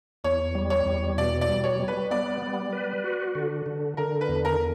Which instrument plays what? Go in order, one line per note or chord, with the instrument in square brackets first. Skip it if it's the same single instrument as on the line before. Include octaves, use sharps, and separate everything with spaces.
[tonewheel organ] E2 [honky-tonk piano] C#5
[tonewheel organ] G3
[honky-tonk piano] C#5
[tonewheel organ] E2
[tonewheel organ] B2 [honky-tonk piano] D5
[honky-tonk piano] D5
[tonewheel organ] G3
[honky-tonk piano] C#5
[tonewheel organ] G3
[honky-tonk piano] B4
[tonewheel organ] B3 [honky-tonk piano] D5
[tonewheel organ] G3
B4
F#4
D3
D3
[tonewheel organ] D3 [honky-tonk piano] A#4
[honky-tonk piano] B4
[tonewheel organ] E2
[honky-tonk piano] A#4